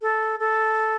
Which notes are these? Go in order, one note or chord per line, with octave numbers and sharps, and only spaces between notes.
A4
A4